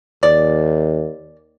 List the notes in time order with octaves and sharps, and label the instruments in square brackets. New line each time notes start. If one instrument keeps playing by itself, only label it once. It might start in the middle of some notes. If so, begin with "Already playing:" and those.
[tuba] D#2 [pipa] D5